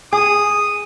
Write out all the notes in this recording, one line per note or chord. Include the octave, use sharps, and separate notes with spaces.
G#4 D#6